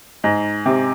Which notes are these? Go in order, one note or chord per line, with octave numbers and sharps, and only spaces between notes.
G#2
C3